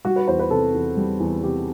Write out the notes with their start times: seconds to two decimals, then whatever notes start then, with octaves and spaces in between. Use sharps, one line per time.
0.05 G3 F#4
0.16 B4
0.28 E2 C5
0.39 B4
0.50 C3 A4
0.74 E2
0.97 G3
1.20 E2
1.43 C3 G4